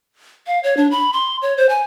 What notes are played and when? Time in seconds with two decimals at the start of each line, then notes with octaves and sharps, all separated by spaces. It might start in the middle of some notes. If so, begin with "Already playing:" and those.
0.47 F5
0.64 C#5
0.77 D4
0.91 B5
1.13 C6
1.42 C#5
1.57 C5
1.69 G#5